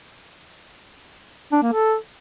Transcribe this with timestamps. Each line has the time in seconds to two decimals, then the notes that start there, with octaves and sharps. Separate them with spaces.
1.52 D4
1.63 A#3
1.73 A4